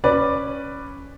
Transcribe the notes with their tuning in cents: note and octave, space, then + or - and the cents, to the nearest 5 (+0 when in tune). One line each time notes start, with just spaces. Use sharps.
C#4 +0 B4 +0 D5 +5